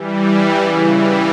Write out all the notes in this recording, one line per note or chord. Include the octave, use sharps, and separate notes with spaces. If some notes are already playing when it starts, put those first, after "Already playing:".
Already playing: E3 G3
C#3 E3
E3 G3